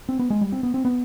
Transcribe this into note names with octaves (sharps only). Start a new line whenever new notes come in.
C4
B3
G#3
G3
C4
B3
C4
B3